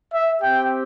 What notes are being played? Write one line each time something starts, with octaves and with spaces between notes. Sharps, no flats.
E5
C4 G4 G5